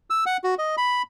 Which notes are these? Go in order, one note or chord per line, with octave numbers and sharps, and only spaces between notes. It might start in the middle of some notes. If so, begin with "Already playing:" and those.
E6
F#5
F#4
D#5
B5